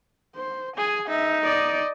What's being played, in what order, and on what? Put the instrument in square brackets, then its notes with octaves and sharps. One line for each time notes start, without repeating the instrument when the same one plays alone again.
[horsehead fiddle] C5
[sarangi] G#4 [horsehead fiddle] G#5
[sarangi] D#4 [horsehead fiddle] E5
[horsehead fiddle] D5 D#5